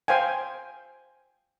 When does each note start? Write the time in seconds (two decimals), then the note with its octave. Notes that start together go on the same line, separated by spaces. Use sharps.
0.08 C5 F5 G5 G#5